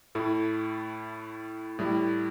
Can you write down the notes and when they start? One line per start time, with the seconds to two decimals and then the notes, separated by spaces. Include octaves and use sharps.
0.15 A2 A3 E4
1.79 A2 G3 E4